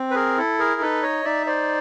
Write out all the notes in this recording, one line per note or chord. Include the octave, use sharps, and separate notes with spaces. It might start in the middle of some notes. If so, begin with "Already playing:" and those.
Already playing: C4
B4
G#4 A#4
E4 A4
G#4 A#4
D#4 A4 B4
C#5 D#5
D#4 D5 E5
C5 D5